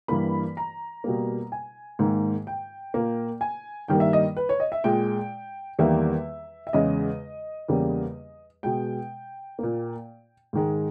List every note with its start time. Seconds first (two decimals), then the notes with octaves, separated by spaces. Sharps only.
0.08 G2 E3 A#3 B5
0.57 A#5
1.04 B2 G3 A#3
1.52 G#5
1.99 G#2 D#3 A#3
2.47 G5
2.94 A#2 A#3
3.41 G#5
3.88 G2 D#3 G3 A#3 G5
4.00 E5
4.13 D#5
4.37 B4
4.49 C#5
4.60 D#5
4.72 E5
4.84 A#2 G#3 G5
5.79 E2 D#3 G3 A#3 E5
6.67 E5
6.73 E2 C#3 G#3 D#5
7.68 E2 C#3 G3 A#3
8.63 B2 G#3 G5
9.59 A#2 A#3
10.53 G#2 D#3 G#3